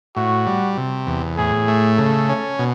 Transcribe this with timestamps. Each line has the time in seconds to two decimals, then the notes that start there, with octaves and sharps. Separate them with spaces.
0.16 A2 F#4
0.47 G3
0.77 C3
1.07 E2
1.37 A2 G#4
1.68 A3
1.98 C#3 A4
2.29 C#4
2.59 B2